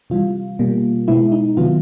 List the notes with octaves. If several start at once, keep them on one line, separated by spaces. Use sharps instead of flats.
C3 E3 G3 F4
B2 G3 A#3
B2 G#3 B3 E4
D#4
C3 D#3 F#3 B3 F4